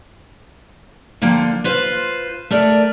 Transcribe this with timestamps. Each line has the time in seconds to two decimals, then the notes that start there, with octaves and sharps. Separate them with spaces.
1.22 D3 F3 A#3 G5
1.64 F4 B4 C5
2.51 A3 A#4 D5